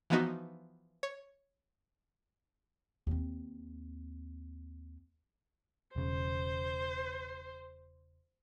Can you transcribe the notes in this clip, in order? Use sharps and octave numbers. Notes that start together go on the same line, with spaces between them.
E3 F3 B3 D#4 F#4
C#5
D#2 C4
E1 C#3 C5